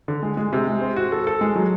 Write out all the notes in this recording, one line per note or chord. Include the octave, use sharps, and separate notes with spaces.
D3
G#3
G#3
C3
G#3
C4
F#4
A4
A4
G#3
F#3